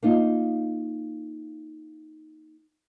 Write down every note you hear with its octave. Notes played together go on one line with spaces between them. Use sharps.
A#3 D#4 F4